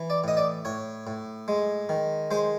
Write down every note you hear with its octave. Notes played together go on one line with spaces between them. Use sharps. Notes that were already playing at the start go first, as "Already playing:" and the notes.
Already playing: E3
D5
A2 D#5
D5
A2 C#5
A2
G#3
D#3
G#3 C5